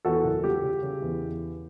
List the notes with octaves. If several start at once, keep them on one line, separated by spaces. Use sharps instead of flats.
E2 F#4 A4
F#1
G3 G4
C#3
C#3
E2